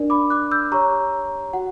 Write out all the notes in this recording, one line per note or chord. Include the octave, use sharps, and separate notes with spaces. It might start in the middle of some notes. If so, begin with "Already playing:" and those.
Already playing: D4 A#4 D5
B5 D6
D6 F#6
E6 G6
G4 C#5 A#5 C#6
F#4 F#5